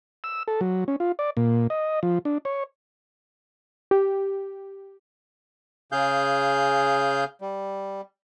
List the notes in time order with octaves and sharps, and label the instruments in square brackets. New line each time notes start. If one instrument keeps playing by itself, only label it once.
[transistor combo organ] E6
A4
F#3
C#4
F4
D5
A#2
D#5
F3
D4
C#5
[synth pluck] G4
[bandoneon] C#3 G#4 F5 G6
G3